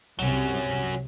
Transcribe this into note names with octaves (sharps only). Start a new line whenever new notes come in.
C2 C3 F#3 C#4